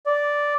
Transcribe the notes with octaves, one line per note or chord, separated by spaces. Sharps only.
D5